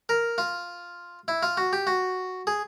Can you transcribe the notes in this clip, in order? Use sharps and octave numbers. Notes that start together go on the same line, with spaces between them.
A#4
F4
E4
F4
F#4
G4
F#4
G#4